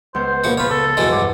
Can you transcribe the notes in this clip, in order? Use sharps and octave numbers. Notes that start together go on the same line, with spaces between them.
C#2 B3 C5 G6
A#1 F3 F#5
F3 B4 C#5
C#3 A4
F1 B1 E2 F#3 G#3
G2 C#5 D5